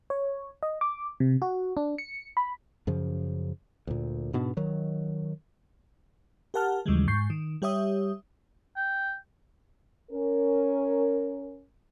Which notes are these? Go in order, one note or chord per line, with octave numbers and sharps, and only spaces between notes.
C#5
D#5
D6
C3
F#4
D4
C#7
B5
F#2 C#3 F3
D2 A#2
G#2 B2 B3 D4
D#3 F#3
G4 A#4 F#5 A5 F6
D#2 C#3 E3 F3 G3 G#3
G#2 C#6 G6 C7
D#3
G3 G4 C#5 E5 D#6
G5
C#4 A#4